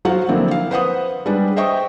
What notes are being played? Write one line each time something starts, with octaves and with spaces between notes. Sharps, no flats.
F#3 F4 F#4 C5 F5 F#5
D3 F3 A#3 C4 E4
F5
B4 C5 F#5 D#6
G3 G#3 D4 B4
C5 D#5 E5 G5 C#6 D#6